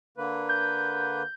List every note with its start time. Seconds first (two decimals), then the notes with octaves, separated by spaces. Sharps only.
0.17 D3 A#3 B4
0.49 G6